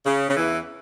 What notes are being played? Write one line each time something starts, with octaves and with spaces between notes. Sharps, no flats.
C#3
C#3
E2 E3